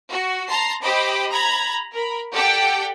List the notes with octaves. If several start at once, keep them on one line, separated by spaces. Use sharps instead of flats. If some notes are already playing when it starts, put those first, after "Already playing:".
F#4
A5 A#5 C6 C7
G4 C5 D#5 G5 B5 D6
A#5 B5 G#6
A#4 B5
G4 A4 D5 F#5 G5